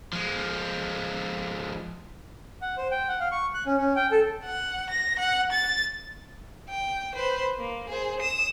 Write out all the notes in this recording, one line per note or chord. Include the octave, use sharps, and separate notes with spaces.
F3 G#3
F#5
C5
G5
F#5
F5
C#6
F#6
C#4
C#4
G5
A4
F#5
A#6
F#5
A6
G5
B4 C5
A#3
G#4 C5
D#6 E7